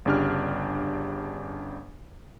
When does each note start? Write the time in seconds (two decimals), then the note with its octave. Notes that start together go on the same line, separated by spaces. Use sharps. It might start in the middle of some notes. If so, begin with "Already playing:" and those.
0.05 G1 C#3 D4 G4 F6